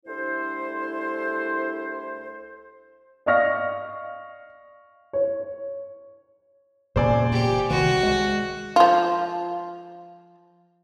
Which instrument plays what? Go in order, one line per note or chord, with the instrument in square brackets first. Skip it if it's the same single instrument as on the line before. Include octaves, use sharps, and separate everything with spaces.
[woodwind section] C2 A3 D4 E4 A4 C5
[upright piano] D5 D#5 F5 C#6 F6 A#6
C#5
[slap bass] E1 A#2 C#3 [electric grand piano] C5 D5 G#5
[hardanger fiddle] G4
[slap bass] C2 D#3 [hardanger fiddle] F#4
[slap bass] G#3
[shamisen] F3 F4